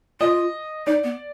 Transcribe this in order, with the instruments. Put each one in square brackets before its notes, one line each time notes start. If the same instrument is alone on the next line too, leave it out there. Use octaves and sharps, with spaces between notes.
[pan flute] F4 [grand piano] D#5
[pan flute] D#4 [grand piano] D5
[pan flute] B3